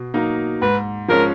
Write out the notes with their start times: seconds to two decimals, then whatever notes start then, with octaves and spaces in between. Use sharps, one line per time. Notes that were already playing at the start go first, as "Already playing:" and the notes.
Already playing: B2
0.14 F#3 A#3 D#4
0.62 G#2 B4
1.08 F3 G#3 C#4 A#4